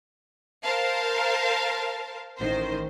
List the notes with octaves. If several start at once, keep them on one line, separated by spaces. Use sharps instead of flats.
A#4 C5 F5 A5
A1 D#3 C5